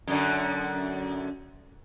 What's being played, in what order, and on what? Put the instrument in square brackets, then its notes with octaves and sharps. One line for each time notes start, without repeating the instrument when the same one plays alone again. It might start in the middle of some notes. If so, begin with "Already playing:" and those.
[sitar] F#2 D3